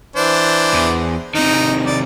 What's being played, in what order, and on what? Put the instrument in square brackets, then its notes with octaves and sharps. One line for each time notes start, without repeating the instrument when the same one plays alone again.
[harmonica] E3 D4 C5
[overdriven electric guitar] E2
[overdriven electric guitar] C3 D#3 [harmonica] D#4
[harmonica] D5